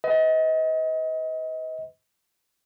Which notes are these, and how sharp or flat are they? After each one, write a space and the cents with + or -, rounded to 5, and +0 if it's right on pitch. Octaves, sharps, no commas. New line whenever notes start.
B4 +35 D#5 +35